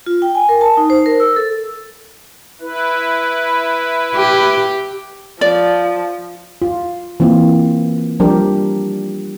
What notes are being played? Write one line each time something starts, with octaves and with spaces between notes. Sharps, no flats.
F4
G5
G#5
A#4
A5
D#4
C5
A#4
E6
A4
E4 B4
G4
F3 D5
F4
E3 A#3 C4 F4
F3 G3 D4 G4 A#4